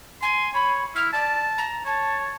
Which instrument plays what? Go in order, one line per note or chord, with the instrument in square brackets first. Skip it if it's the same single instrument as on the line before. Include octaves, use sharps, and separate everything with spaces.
[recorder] G#5 [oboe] C6
[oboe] C#5 [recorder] B5
[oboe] E4 [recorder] F6
[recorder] D5 [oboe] A5
[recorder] A#5
[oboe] C#5 [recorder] A5